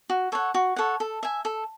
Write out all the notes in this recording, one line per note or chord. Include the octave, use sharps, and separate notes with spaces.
F#4
A4 C#5 F#5
F#4
A4 C#5 F#5
A4
E5 G#5
A4